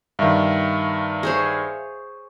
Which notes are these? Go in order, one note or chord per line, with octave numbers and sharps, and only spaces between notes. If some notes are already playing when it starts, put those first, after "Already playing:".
G2 D#3 E5 F5
G#4 C5 C#5